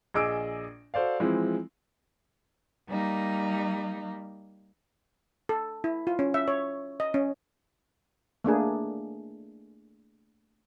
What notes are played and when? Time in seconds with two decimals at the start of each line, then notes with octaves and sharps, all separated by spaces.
0.14 A#1 G#4 D#5 D6 E6 D7
0.94 F#4 A4 C5 D5 F5
1.20 E3 F3 G#3 C4 E4
2.88 G3 A#3 D#4
5.49 A4
5.84 E4
6.07 F4
6.19 C#4
6.34 E5
6.48 C#5
7.00 D#5
7.14 C#4
8.44 A3 A#3 D4 G#4